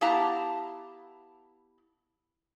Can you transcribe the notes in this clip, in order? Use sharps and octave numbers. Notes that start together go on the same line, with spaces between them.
B3 E4 G4 F5 A5 A#5